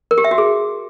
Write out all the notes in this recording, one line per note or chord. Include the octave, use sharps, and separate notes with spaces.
A#4
G4
E5
F#4
G#4